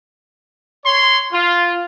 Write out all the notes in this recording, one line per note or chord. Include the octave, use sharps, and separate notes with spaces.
C#5 C6
F4